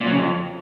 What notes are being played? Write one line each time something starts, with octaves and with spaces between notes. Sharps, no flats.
A#2
F#3
C#3
F2